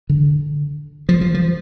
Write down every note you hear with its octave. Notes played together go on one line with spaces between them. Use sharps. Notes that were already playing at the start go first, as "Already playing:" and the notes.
D3
F3
F3
F3